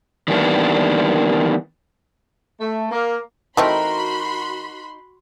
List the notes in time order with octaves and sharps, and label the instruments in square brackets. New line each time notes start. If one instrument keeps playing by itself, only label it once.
[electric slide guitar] D#3 E3 G3 A#3 B3 D4
[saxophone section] A3
A#3
[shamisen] E3 A3 C4 [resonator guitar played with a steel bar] D#4 A#4 [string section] F#4 B5 C6